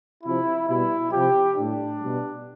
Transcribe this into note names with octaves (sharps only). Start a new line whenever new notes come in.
C3 F3 E4
B2 G3 E4
C3 F3 G4
A2 G3 D4
B2 G3